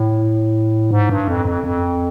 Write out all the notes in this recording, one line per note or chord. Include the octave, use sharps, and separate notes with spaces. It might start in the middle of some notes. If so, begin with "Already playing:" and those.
Already playing: A2
G#2
G2
F2
F2
F2